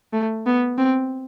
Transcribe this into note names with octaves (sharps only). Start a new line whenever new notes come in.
A3
B3
C4